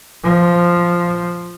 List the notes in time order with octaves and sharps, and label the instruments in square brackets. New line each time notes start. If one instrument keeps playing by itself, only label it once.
[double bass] F3